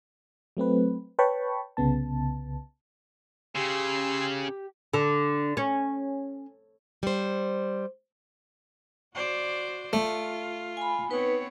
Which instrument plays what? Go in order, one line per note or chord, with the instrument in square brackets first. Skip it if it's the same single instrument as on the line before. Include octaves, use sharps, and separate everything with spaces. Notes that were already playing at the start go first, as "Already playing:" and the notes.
[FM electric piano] F#3 A3 C4 B4
B4 C#5 G5 A5 B5 C#6
C2 C#3 B3 A5
[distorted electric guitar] C#3 [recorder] G4 [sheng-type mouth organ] G#5 C6 E6
[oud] D3
C#4
[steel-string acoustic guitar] G3 C5
[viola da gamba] F#4 C5 D5
[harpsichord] A3 [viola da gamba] F4
[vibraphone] G#5 B5
[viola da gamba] B3 C4 C#5 [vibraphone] D#4 B4